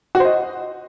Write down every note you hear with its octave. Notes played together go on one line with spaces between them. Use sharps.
F#4
C5
D#5